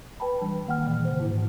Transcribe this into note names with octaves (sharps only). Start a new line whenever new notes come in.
B4 G5 A5 B5
E3 G3 D4
D#3 A#3 F#5 G5 F6
A#2 E3
C#3 C5
G#2 E4